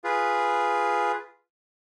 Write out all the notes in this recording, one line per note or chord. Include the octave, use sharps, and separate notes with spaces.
F4 G#4 B4